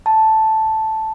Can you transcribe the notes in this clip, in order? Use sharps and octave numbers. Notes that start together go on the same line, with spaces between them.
A5